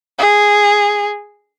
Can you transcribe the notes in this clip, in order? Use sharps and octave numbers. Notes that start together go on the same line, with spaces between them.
G#4